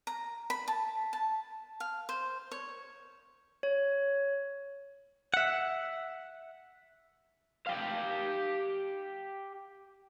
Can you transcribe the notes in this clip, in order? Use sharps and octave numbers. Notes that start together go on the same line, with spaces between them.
A#5
B5
A5
A5
F5
C5
C#5
C#5
E5 F#5
G4 F5